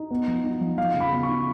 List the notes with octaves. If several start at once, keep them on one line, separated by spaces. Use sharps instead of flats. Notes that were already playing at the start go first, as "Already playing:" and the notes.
Already playing: D#4
B3
F3
D#4
F3
F3 F5
C#3
B5
B3
C#6
D#4